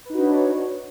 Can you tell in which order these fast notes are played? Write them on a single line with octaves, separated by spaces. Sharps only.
B4 D#4 F#4 D4 C#5